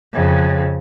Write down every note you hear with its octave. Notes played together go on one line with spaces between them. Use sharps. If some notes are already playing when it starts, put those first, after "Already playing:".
F2 C#3